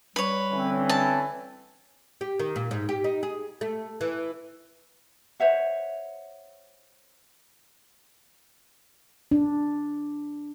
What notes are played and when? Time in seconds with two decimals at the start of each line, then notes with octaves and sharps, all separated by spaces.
0.16 G3 B4 C#5
0.51 D3 E3 C4 C#4
0.89 A5
2.21 G4
2.39 D#3
2.56 A#2
2.71 G#2
2.89 G4
3.04 D#4
3.23 G#4
3.61 A3
4.01 E3
5.40 C5 C#5 E5 F#5
9.31 D4